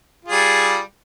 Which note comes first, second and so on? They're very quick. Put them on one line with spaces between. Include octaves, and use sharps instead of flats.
F4 G#4 G3